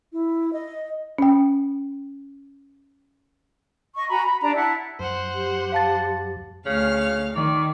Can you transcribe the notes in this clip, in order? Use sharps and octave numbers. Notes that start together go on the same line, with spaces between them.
E4
D#5
C#4 G5
D#5 C#6
F#4 G#5 A#5 B5
B5
D4 G4 A#5
E4 F#5 A5
F#2 C5 F#5
G4
F5 A5 A6
D2 C#3 F5 F6
D#3 D5